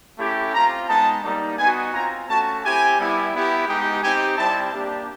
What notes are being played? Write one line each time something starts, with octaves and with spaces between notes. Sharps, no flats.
A3 C#4 E4 G4
C4 F4 A#5
G#3 B3 D#4 A5
G3 A#3 D#4
B3 D#4 F#4 G#5
C4 F4 A#5
A3 C#4 F#4 A5
C4 E4 G4 G#5
G3 B3 E4 G4
B3 E4 G4
G#3 B3 D#4 G4 G5
C4 D#4 G4 G#5
G3 C4 E4 A5
A#3 D4 G4